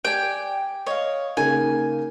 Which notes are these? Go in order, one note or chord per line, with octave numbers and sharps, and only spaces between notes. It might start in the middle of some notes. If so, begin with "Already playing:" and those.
G4 D5 G5 G#5
C#5 D#5 F5
C#3 A#3 D#4 G#5